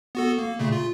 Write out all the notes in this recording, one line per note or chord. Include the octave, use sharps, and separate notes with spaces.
B3 F#4 A4
A#3
A#2 C#3 A3
F4